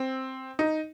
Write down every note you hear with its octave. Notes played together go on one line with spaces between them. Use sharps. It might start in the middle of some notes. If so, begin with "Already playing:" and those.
Already playing: C4
D#4